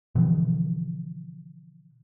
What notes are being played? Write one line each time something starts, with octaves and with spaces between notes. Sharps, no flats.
B2 D3 E3 F3